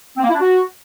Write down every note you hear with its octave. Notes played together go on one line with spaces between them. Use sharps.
C4
A#3
E4
D4
F#4